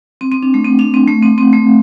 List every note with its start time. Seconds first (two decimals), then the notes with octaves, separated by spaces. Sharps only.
0.21 C4
0.32 C4
0.42 D4
0.54 A3
0.65 C4
0.79 D4
0.94 C4
1.08 A3
1.23 C4
1.38 C4
1.53 A3